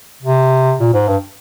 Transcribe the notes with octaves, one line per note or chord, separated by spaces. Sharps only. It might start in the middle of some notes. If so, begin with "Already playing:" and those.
C3
A#2
G#2
G2